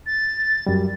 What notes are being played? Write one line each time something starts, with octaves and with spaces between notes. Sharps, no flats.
A6
F#2 G3